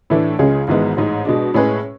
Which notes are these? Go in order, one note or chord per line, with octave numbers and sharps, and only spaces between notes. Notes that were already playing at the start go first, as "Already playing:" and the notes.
A2 E3 A3 D4
C#2 C#3 G#3 C#4 G#4
G#1 G#2 E3 G#3 B3
A1 G#2 G#3
B2 G#3 D4
A2 G#3 C#4 G#4 B4